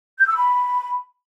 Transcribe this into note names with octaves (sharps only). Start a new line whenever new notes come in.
G6
E6
B5